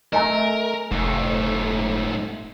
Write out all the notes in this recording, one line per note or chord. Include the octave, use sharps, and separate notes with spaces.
A3 A#4 D#5 G#5 A#5
F1 G#2 A3